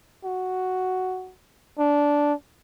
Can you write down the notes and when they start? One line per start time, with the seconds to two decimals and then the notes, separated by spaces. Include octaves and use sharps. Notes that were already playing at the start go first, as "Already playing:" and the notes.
0.24 F#4
1.79 D4